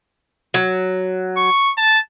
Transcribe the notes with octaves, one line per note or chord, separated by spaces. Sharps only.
F#3
C#6
A5